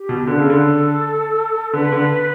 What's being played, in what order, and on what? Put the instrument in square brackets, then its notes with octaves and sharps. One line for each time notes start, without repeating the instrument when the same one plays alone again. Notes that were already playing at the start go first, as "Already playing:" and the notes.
Already playing: [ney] G4
[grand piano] B2
[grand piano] D3 [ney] A4 B4
[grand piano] C#3
D3
[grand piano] D3 [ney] B4
[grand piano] D3